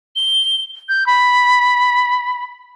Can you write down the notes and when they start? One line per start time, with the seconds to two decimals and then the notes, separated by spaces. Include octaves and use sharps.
0.16 G7
0.89 G6
1.06 B5